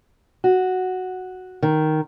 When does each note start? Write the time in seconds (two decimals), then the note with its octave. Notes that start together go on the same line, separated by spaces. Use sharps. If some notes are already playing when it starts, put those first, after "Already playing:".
0.44 F#4
1.62 D#3